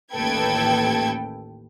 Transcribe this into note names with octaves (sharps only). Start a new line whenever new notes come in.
A1 D#2 A4 B4 G5 G#6